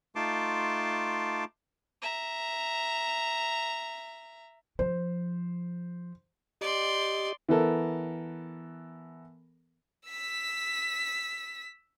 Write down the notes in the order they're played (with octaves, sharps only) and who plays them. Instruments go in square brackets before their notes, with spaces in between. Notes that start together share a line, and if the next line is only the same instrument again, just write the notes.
[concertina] A3 D#4 F4 A5 C6 D6
[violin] E5 A#5
[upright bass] F3 [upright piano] C5
[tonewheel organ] G4 D#5 [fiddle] D5 C6
[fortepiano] E3 B3 A4 A#4
[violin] E6 B6